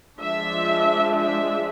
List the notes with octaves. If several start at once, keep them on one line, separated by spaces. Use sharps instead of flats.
F3 G#3 D4 E5
E5